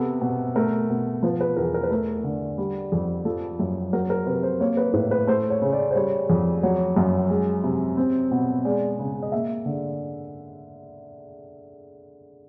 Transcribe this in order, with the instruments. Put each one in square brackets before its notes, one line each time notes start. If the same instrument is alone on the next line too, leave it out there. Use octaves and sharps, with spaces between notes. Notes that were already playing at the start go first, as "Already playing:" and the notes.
Already playing: [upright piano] C3 B3 A4
B2
A3 A#4
B2
F3 B4
B4
E2 A#4
A#4
B4
A3 A#4
D3
G3
F2
F3 A4
F#2
F#3 A#4
A#4
C3 B4
C5
A#3 C#5
B4
A2 B4
B4
A3 C5
C#5
C#3
D5
C5
G3 C#5
F2
F#3 C#5
F#2
G#3
C3
C4
B2
G#3 D5
C#3
D#5
A#3 E5
D3